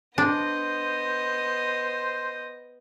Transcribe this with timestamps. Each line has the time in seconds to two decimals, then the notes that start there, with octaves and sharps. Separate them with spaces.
0.18 B3 D4 C5 D#5